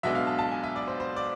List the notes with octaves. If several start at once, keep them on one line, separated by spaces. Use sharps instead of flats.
B1 B2 G#3 B3 D4 E5
F5
A5
A5
G#5
E5
D5
C5
C5
D5